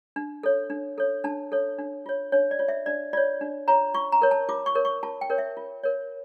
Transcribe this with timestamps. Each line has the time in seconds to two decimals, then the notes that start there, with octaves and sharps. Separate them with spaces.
0.16 D4
0.43 A4 C#5
0.70 D4
0.98 A4 C#5
1.24 D4 A5
1.52 A4 C#5
1.79 D4
2.06 F4 C#5
2.32 D4 C#5
2.51 D5
2.59 F4 C#5
2.68 E5
2.86 D4 D5
3.13 F4 C#5 D5
3.41 D4
3.68 F4 C#5 A#5
3.94 F4 C#6
4.12 A#5
4.22 A#4 C#5
4.31 A5
4.49 F4 D6
4.66 C#6
4.75 A#4 C#5
4.85 C#6
5.03 F4 A5
5.21 G5
5.30 A#4 C#5
5.38 E5
5.57 F4
5.83 A#4 C#5